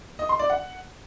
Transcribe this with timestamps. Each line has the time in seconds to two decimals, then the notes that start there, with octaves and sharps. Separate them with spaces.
0.19 D#5
0.29 C6
0.39 D5
0.50 F#5